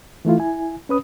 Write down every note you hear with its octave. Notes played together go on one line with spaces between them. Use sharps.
E3 A3 E4 F4
E4 G#5
C#4 B4 D#6